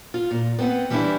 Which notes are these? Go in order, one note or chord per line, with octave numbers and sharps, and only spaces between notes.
F4
A#2
B3 C4 B4 F#5
E3 G3 C#4 D4 E4